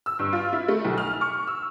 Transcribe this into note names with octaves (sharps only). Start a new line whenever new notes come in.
E6
G2
F4
E4
A3
B1
F6
C#6
E6